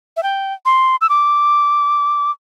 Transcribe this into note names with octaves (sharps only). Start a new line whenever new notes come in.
E5
G5
C6
E6
D6